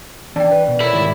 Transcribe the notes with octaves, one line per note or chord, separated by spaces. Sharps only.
E3 D4 D5 G5 A5
B4
B2
A4 A#4 C#5 E5 B5
G#2 D#3 G3